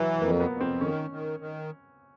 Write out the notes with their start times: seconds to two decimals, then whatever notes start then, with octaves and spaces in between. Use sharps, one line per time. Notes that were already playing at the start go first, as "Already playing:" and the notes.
Already playing: E3 F#3
0.21 F2 A#3
0.40 B3
0.50 F2
0.61 C4
0.81 D#3 C#4
1.10 D#3
1.40 D#3